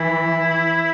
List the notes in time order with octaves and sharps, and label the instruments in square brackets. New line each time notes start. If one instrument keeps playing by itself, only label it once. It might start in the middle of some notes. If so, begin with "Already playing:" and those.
Already playing: [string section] E3 [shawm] E4